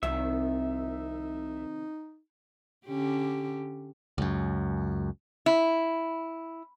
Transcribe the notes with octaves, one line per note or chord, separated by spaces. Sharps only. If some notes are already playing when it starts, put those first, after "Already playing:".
C2 C3 D#3 F3 D#4 E5
D3 C#4 G4
C#2 F#2
E4